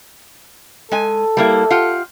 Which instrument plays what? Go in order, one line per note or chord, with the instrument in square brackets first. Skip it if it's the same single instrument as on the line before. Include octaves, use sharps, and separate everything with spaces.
[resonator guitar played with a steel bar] G#3 G#5 [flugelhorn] A4
[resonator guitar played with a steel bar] G3 A#3 E4
F4 G4 F#5